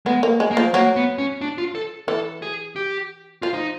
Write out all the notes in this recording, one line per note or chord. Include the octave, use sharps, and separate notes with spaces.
G#3 B3
A#3
G#3
A#3
F3
F#3 A#3
B3
C#4
D4
F4
A4
E3 A4
G#4
G4
F3 F4
D#4